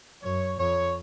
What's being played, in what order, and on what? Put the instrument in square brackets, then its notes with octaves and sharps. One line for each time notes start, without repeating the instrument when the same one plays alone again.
[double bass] F#2 [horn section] C#5
[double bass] F2 [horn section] C#5